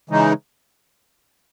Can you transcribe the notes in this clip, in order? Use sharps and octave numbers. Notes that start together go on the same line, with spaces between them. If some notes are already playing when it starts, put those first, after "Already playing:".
C#3 E3 G#3 D#4